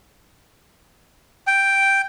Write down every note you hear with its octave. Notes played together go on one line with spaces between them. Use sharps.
G5